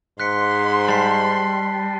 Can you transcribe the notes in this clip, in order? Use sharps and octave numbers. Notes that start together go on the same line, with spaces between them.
G#2 C6 F#6 B6 C#7
G3 A5 C7